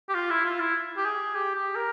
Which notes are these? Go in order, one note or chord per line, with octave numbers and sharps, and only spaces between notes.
G4
F4
E4
F4
E4
G4
G#4
G4
G4
A#4